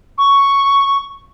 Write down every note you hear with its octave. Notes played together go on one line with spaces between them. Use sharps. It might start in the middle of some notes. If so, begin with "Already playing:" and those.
C#6